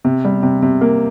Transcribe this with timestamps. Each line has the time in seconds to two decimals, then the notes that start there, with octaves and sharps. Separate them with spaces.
0.05 C3
0.25 G3
0.43 C3
0.62 C3
0.81 A#3